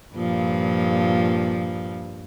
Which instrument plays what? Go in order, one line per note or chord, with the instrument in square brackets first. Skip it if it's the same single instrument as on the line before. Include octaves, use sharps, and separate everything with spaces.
[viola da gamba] G2 A#2 F3